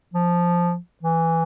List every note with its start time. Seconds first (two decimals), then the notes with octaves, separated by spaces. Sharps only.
0.14 F3
1.03 E3